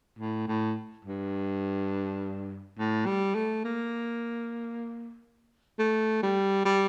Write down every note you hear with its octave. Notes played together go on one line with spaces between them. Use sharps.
A2
A2
G2
A2
G3
A3
A#3
A3
G3
G3